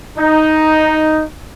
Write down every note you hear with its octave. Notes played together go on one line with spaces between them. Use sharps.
D#4